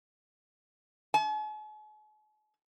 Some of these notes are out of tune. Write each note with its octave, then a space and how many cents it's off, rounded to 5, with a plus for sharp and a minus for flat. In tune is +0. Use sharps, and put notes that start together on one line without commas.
G#5 +45